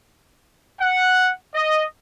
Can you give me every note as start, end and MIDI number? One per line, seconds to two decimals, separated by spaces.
0.81 1.31 78
1.55 1.85 75